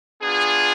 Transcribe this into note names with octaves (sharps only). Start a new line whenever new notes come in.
B3 D4 F4 G#4